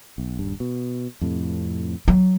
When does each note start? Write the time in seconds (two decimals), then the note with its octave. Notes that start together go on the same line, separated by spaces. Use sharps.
0.18 B1
0.39 D#1 G2
0.60 B2
1.21 F2 A2 C3
2.08 F#3